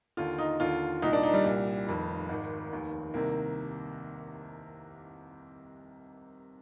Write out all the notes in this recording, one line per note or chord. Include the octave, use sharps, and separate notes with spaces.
D#2 D3 F4
D#4
D#2 D3 F4
C2 A#2 D#4
D4
D#4
G3
C2 A#2
F1 F2 D#3
G#1 G#2 D#3
F1 D#2 D#3
C2 C3 D#3 A#3